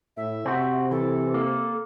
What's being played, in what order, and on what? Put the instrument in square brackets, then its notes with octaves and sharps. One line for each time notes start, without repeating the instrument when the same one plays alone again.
[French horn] A2 [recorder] E5
[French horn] C3 [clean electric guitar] C4 F#4
[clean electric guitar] E3 [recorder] A4
[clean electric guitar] A#3